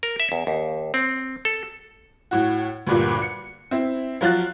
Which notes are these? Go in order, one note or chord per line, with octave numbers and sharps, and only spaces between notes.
A#4
E5
E2
D#2
C4
A4
A2 F#4
D2 G2 A#2
C#7
C4 E4
F3 F#3 F4 F#6 A6